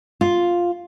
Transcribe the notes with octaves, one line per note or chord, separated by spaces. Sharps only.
F4